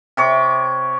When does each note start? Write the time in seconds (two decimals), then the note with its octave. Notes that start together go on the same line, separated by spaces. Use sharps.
0.17 C3 C#5 D6